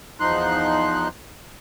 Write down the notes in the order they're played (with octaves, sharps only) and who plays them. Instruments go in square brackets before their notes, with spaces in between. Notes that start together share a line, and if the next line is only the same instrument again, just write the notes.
[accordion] E2 F3 D#4 C6 F#6